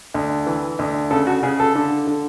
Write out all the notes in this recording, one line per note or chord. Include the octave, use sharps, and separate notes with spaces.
D2
E3
D2
C#3 A4
F#4
C#3 G#4
A4
D3
D3